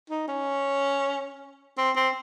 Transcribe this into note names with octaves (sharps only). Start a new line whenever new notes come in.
D#4
C#4
C4
C4